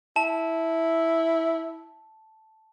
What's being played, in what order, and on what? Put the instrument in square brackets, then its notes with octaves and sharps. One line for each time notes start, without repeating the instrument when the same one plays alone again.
[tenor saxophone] E4 [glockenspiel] A5